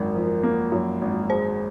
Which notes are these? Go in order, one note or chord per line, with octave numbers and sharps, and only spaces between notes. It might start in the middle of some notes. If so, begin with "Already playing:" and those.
Already playing: G#1 F#2 A#4
F3
A#3
F#2
G#1
G#3 C5